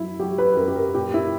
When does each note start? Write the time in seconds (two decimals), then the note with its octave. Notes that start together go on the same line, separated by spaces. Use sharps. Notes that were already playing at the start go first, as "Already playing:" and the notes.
Already playing: F#2 F#3 E4
0.19 F#3 G4
0.38 B4
0.57 F#2 A#4
0.68 G4
0.76 A#4
0.94 A#2 G4
1.14 E4